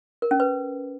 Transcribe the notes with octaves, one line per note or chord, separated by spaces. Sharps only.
A#4
C#4
B4